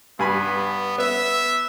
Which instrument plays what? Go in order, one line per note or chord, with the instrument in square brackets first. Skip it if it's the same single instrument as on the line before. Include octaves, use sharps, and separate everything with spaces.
[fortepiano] G2 G#5 B5 [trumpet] B3
[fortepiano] B3 [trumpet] E5